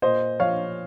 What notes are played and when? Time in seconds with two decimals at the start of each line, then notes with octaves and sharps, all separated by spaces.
0.02 A#2 C5 D#5
0.40 F3 C#5 F5